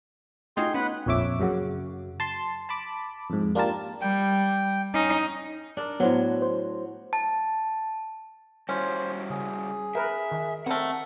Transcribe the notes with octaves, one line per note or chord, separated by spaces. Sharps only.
A3 D#4 F4 F#4 G#4 D#5 G5 C6
B3 C#4 B4 F#5 B5
A#1 F2 C#5 E5 D6
F#2 C#3 F#4
A5 C6
A5 B5 D6
F2 G#2
A#3 D4 F4 G4 A#4 A5
G3 G5
C#4 D#4
D4 A#4
A2 F#3 B3 C5
C5
A5
G3 C#4 E4 F#4 C5
C#3 G#4
A#4 B4 E5
D#3
D#3 A3 C4 A#4 F#5